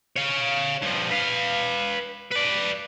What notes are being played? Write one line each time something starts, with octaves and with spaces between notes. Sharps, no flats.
C#5 F5
G2 F3
B4 F5
B4 D5